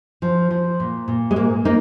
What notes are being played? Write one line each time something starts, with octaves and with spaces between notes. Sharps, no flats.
F3
F3
A#2
A#2
G#3
G#2 A#3
A#3 D#4